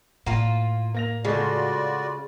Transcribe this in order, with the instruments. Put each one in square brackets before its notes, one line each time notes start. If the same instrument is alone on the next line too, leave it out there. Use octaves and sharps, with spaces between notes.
[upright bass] A2 [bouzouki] A#3 F4
[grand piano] A#3 A#6 F7
[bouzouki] C#3 [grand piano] G#3 A3 [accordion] F4 F#4 D5